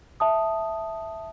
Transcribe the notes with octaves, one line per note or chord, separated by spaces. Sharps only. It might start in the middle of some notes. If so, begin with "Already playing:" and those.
E5 A5 D#6